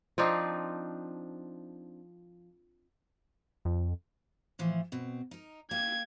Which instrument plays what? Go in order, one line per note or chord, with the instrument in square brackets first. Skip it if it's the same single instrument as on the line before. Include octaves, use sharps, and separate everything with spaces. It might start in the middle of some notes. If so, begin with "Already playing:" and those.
[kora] F3 C4 D4 D#4
[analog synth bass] F2
[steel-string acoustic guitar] A2 E3 F3
B2 C4
D#4 A#4
[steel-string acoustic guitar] A#3 G4 [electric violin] G#6